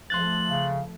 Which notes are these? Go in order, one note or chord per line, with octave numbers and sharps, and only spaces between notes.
F3 A3 C6 F#6 A6 F#7
C#3